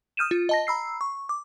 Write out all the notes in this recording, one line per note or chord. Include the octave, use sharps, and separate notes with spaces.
D#6 F6 G6 D#7 E7
F4
D#5 A5 A#6
A#5 B5 E6 C7
C#6
D6